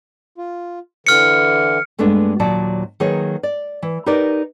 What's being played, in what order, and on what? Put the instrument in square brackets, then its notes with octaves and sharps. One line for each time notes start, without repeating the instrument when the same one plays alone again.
[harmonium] F4
[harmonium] D3 E3 [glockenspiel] F6 C#7
[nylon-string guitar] G2 G#3 A3 B3 D4
D#2 A#2 F#3 D5 A5
D#3 F#3 A#3 G#4 B4 C#5
D5
E3
D#4 G4 A#4 B4 D5